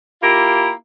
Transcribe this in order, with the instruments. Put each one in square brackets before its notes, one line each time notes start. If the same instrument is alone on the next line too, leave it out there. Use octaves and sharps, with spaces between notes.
[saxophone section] A#3 E4 F4 G4 A#4